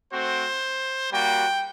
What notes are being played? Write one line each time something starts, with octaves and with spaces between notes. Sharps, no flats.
A3 C4 F#4 C5
G3 A#3 F#4 G5